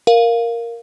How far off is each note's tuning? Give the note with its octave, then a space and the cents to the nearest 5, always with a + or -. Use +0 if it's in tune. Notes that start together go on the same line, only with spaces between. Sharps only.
A#4 +0 F5 +0